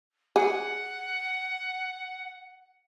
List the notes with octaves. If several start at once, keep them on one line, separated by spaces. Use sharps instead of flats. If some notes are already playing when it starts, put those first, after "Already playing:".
G#4 F#5